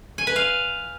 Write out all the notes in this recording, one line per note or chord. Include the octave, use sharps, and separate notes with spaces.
G#5
B4
F5